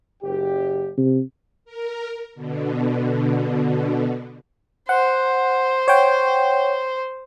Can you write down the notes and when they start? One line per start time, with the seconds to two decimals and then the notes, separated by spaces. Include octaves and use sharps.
0.23 F#1 G4
0.97 C3
1.65 A#4
2.35 B2 D3
4.89 C5 F#5
5.88 C#5 F#5 G5